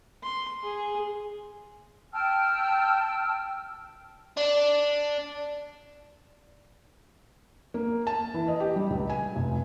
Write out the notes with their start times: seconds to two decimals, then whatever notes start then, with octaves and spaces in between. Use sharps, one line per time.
0.23 C6
0.63 G#4
2.13 G5 A5 E6 F6
4.37 D4
7.74 A#3
8.07 A5
8.34 E3
8.48 D#5
8.60 G4
8.76 G3
8.90 C#2
9.10 G#5
9.36 F1